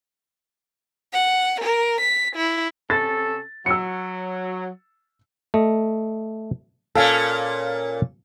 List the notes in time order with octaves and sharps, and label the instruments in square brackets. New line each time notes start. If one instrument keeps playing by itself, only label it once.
[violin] F#5
A#4
B6
E4
[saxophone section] C3 C#4 A4 [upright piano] A6
[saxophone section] F#3 [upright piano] E6 C#7
[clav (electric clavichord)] A3 D#5
[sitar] A#2 C#4 [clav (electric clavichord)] A4 F5 G#5